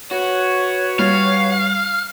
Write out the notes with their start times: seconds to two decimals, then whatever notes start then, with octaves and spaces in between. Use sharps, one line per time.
0.11 F#4 B4 C#5
0.99 G3 F5